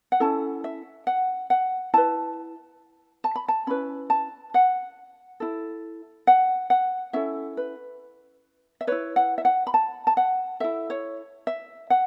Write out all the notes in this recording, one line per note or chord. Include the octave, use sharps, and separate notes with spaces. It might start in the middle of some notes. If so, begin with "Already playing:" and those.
F#5
C#4 E4 A4 A5
E5
F#5
F#5
E4 B4 A5
A5
B5
A5
C#4 E4 B4 B5
A5
F#5
E4 A4
F#5
F#5
C#4 E4 A4 E5
B4
E5
E4 B4 C#5
F#5
E5
F#5
B5
A5
A5
F#5
E4 A4 E5
C#5
E5
F#5